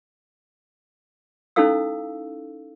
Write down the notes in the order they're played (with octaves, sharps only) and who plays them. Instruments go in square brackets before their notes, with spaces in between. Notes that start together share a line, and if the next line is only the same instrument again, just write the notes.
[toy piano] C#4 D#4 E4 A4 F5 E6